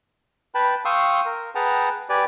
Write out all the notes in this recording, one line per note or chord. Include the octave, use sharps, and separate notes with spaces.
B4 G5 A5 B5
F5 G5 C6 C#6 D#6 E6
A#4
G#4 B4 F#5 G5 A5 A#5
G4 B4 D5 G5 G#5